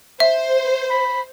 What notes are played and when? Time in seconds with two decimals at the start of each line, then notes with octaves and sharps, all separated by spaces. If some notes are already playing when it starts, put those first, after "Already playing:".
0.20 C5 E5
0.90 B5